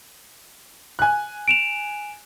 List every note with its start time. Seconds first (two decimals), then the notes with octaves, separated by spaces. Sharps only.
0.99 G#5 F#6
1.48 D7 E7 F7